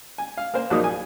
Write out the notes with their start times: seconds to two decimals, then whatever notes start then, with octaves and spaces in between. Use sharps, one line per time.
0.18 G#5
0.37 F5
0.54 A#3 A#4 C5
0.70 A#1 F#3 A#3 D#4 D#6
0.84 G#5